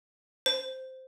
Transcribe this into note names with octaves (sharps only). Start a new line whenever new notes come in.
C5